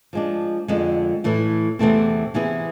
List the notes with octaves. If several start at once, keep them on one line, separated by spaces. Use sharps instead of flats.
F3 G#3 D4
F2 D3 G#3
A2 E3 A3
E2 C3 E3 A3 C4
C3 E3 B3 E4 G#4